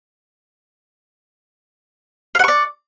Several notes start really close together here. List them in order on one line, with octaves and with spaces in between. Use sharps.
F5 F#5 C#6 D5